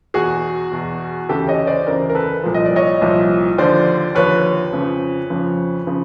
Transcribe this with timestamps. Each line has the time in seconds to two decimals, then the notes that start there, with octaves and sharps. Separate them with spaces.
0.14 E2 B2 F#4 G#4
0.72 E2 B2
1.29 D2 C#3 E3 G4 A4
1.48 C#5 D#5
1.67 C5 D5
1.86 D2 C#3 E3 A#4 C5
2.09 A#4
2.15 A4 B4
2.43 C2 A#2 F3
2.54 D#5
2.66 D5
2.76 C#5 D#5
3.01 C2 A#2 F3
3.58 D#2 D3 F3 C5 D5
4.15 D#2 D3 F3 B4 C#5
4.73 F2 C#3 F3
5.30 F2 C#3 F3
5.87 C#3 F3